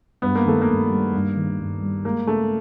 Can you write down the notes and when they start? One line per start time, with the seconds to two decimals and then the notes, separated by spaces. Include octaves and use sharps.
0.22 G2 B3
0.35 A#3
0.46 D#3 A3
0.62 A#3
0.68 G2
0.90 G3
1.13 G2
1.36 D#3
1.59 G2
1.81 G3
2.05 G#3 A#3
2.27 C#3 A3